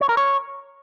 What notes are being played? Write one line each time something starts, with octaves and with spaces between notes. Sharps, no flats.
C#5
A#4
C#5